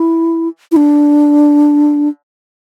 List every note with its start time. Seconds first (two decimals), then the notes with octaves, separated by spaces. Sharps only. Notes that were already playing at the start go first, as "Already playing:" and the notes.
Already playing: E4
0.72 E4
0.76 D4